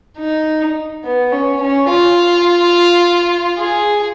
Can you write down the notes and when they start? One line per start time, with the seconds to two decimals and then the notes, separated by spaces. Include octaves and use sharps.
0.18 D#4
1.04 B3
1.32 C#4
1.61 C#4
1.88 F4
3.58 G#4